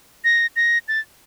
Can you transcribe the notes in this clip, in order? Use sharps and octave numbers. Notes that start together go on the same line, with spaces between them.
A#6
A#6
A6